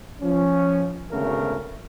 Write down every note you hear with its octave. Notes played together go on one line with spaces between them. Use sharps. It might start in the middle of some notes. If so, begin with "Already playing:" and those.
F3 C#4
G#1 D2 C#3 A3 B3 A#4